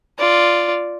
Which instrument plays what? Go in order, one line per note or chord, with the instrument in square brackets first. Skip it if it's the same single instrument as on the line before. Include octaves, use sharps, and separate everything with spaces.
[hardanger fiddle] F4 D5